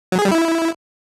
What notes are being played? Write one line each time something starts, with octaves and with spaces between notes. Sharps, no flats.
F#3
G#4
G3
E4